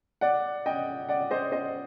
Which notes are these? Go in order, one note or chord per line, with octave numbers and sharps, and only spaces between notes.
D5 F#5
D#5 G5
D5 F#5
C5 D#5
C5 D#5